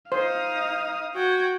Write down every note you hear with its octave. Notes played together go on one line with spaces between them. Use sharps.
D#4 C5 F5 D#6
F#4 G5 G#6